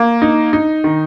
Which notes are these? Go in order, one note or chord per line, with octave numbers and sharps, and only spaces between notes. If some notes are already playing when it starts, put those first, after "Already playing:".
Already playing: A#3
D#4
D#4
D#3